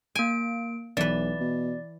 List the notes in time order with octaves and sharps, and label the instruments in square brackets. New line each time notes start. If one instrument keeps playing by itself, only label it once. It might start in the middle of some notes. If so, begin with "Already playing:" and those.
[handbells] A#3 D7 [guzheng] G#5
[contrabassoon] B1 [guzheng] E3 B4 [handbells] D5
[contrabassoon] B2